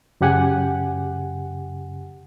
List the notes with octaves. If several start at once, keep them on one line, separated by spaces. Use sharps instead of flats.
F#2 C#3 G4 F#5 G#5